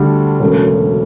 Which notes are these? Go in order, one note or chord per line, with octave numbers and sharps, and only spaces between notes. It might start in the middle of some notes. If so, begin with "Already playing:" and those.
Already playing: D2 D3 G3
E1 D2 C#3 F#3 A#3